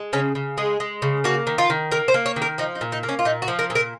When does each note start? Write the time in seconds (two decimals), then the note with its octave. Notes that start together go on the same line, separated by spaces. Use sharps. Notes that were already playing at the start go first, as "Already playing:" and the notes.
Already playing: G#3
0.13 C#3 C#4
0.35 C#3
0.58 G#3 G#4
0.80 G#3
1.02 C#3
1.24 A#3 F#4
1.47 D#3
1.58 F4
1.70 D#3
1.92 A#3 A#4
2.08 C5
2.14 A#3
2.26 C#5
2.36 D#3
2.42 A#4
2.58 F3 D#4
2.75 D#4
2.81 A#2
2.92 D#4
3.03 A#3
3.09 C#4
3.19 F4
3.25 A#2 D#4
3.42 F#4
3.48 F3
3.59 A#4
3.70 A#2
3.75 A#4